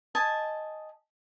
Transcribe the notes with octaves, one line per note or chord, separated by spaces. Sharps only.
D#5 G#5 A5